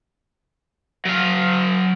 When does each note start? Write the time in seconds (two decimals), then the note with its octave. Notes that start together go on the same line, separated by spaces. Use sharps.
1.05 F#3 F5